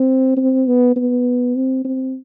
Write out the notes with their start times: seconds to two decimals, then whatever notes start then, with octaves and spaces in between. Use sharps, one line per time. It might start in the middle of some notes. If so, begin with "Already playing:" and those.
Already playing: C4
0.37 C4
0.67 B3
0.96 B3
1.56 C4
1.85 C4